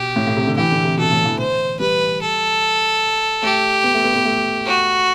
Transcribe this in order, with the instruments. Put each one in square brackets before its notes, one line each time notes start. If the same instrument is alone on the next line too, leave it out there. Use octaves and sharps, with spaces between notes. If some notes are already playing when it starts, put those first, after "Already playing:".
Already playing: [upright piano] B2 [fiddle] G4
[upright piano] A2
A2
C3
D3
[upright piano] E3 [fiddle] G4
[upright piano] D3
C3
[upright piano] B2 [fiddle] A4
[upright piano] A2
E3
[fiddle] C5
[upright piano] G3 [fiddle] B4
[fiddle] A4
[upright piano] A3 [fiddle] G4
[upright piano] B3
A3
B3
B3
A3
[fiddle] F#4